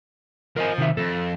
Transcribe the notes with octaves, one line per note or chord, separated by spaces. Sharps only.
F3 A#4 D#5 G#5
C3 D#3 E5
F2 A4